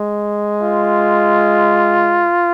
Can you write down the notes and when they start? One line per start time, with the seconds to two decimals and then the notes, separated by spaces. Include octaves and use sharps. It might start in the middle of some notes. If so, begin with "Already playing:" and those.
Already playing: G#3
0.62 F4